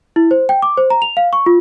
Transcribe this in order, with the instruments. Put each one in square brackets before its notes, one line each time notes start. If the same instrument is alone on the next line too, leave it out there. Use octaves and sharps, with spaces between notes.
[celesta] E4
C5
G5
D6
C5
A#5
F7
F5
C#6
F4